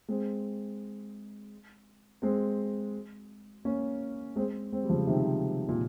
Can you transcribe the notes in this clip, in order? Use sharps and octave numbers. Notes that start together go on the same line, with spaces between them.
G#3 C4
G#3 C4
A#3 C#4
G#3 C4
G#3 C4
G3
C#3 F3
C3 D#3
A#2